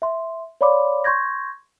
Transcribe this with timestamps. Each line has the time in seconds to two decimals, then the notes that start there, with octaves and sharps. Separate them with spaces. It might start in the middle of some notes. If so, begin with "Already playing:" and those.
0.02 E5 C6
0.61 C#5 D5 F5 B5 C6 D6
1.04 C6 C#6 G6 G#6 A#6